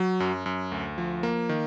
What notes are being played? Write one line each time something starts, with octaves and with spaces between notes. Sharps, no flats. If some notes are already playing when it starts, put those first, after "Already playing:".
Already playing: F#3
F#2
F#2
D2
F3
A#3
D#3